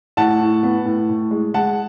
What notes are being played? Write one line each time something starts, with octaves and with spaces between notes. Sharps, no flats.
A2 F#5 A5
A2
B3
A2
A2
G#3
G#3 F#5 A5